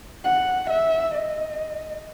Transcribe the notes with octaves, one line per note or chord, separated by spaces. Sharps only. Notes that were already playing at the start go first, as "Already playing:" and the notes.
F#5
E5
D#5